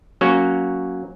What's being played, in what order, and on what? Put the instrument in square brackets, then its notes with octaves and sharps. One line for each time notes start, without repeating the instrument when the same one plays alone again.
[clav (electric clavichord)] F#3 A#3 C#4 F#4